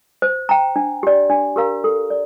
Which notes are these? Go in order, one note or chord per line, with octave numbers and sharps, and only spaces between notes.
C5
G5 A#5
D4
G4 D5
D4
G4 A#4 F5 A#5
A4
D5